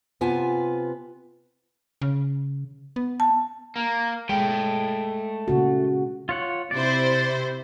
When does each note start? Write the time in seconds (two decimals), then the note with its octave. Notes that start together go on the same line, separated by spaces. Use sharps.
0.21 C3 B3 F4 G#5 A5
2.02 C#3
2.96 B3
3.20 A5
3.76 A#3
4.29 G#3 A3 G5
5.48 A#2 C#3 F#4
6.29 F4 C#5 F#5
6.71 C3 E4 C5 D5